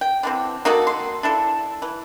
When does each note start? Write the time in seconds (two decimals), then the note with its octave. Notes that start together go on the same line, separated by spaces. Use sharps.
0.01 G5
0.23 D3 E3 C4
0.65 A#3 D#4 F#4 A4
0.87 C6
1.23 D4 E4 A4
1.82 E3